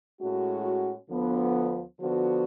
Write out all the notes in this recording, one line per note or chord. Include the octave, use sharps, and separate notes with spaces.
A2 G#3 C#4 F#4
D2 D3 F3 B3
D3 F3 B3 F#4